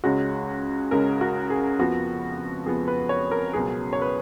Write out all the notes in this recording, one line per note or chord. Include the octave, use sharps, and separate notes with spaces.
C#2 C#3 G#3 C#4 F#4
C#2 C#3 G#3 C#4 A#4
F#4
G#4
F2 F3 B3 F#4
F2 F3 B3 G#4
B4
C#5
A#4
C#2 B2 F#3 C#4 G#4
C#5
B4